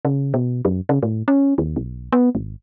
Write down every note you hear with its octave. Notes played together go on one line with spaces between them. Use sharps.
C#3
B2
F#2
C#3
A2
C#4
D#2
B1
B3
G#1